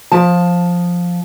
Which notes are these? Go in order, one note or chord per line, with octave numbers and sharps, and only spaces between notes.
F3 A5